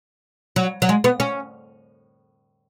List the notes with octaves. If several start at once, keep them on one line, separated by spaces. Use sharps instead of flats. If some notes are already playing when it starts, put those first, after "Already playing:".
F#3
F#3
G#3
B3
C#4